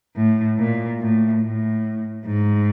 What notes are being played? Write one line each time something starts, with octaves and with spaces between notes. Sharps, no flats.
A2
A#2
A2
A2
G#2